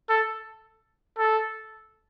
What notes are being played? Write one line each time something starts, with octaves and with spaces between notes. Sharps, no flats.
A4
A4